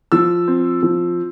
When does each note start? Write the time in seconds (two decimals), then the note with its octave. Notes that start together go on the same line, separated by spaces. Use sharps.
0.12 F3 E6
0.48 C4
0.83 F3